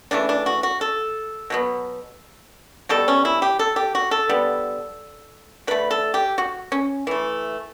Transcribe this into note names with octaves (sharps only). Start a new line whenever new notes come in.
C#3 E3 A3 D4
D4
F#4
F#4
A4
B2 F#3 B3
B2 G3 B3 A4
C#4
E4
G4
A4
G4
F#4
A4
D3 G3 B3
D3 A3 B4
A4
G4
F#4
C#4
E3 A3